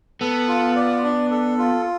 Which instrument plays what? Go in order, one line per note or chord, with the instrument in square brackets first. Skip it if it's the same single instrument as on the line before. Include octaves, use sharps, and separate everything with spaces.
[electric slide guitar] B3 [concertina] A4
[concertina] F4
D5
D4
A4
F4